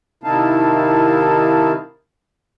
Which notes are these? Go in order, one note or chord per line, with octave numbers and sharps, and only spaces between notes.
C3 D#3 D#4 E4 F5 A5